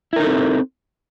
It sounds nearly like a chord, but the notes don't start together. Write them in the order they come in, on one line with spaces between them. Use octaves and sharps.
E4 A#4 D#4 A4 C4